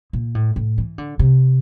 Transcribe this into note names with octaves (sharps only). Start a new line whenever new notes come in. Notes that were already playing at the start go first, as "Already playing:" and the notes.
A#2
A2
A2
E3
D3
C3